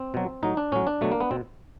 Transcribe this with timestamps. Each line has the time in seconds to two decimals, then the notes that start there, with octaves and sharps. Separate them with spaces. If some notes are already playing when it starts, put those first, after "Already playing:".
Already playing: C4
0.14 B2 F#3
0.43 A2 F#3 D#4
0.57 D4
0.72 A2 F#3 C#4
0.87 D4
1.01 B2 F#3 A3
1.12 A#3
1.20 B3
1.31 B2 C4